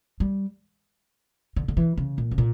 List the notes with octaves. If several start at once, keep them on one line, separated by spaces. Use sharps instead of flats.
G3
D3
D3
E3
C#3
A#2
C#3
A#2